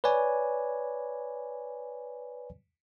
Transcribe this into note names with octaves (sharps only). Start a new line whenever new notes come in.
B4 C#5 D5 G#5